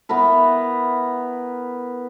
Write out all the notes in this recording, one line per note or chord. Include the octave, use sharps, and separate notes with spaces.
B3 E4 A#4 B4